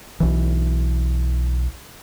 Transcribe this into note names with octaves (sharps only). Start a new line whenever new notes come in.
B1 E3